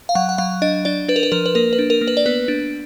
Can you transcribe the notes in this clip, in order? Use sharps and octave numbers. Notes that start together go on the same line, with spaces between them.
F5
F#3 F#5
F#5
F#3 F5
D4 D#5
D4 D5
D4 B4
A#4
B4
F3 A#4
B4
A#3 A#4
B4
D4
A#4
A#3
B4
D5
B3 B4
D4